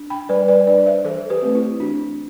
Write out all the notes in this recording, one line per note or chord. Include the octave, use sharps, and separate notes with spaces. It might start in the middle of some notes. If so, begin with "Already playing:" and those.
Already playing: D4
G5 B5
G3 B4 D5
B4 D5
D4 B4 D5
D5
C5 E5
E3 A4 C5
G4 B4
A3 C4
E4 G4
E3 D4 F#4